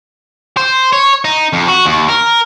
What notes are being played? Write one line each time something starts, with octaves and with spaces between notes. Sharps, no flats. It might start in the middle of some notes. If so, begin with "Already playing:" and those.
C5
C#5
D#4
F2
F#4
D#2
A#4